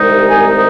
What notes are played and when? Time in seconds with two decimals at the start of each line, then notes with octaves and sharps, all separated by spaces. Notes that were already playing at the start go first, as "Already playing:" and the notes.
Already playing: C2 C3 D#3 G#3 D#4
0.28 G#5